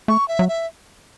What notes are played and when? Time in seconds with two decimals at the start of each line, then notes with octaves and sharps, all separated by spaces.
0.08 A3 C#6
0.28 E5
0.39 F#3
0.49 E5